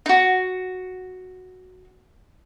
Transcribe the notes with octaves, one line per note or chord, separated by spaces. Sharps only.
D#4 F#4